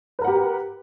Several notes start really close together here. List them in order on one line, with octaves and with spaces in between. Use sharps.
B4 A#4 F#5 G4